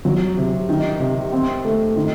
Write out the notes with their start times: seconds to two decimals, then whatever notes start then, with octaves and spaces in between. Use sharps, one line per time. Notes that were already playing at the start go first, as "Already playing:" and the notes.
0.05 F#3
0.37 C3
0.69 D#3
1.00 C3
1.32 C4
1.65 A3
1.96 D#3